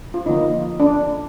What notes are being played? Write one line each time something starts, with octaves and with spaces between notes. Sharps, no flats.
F4
D3 F3 A#3 D#4
D4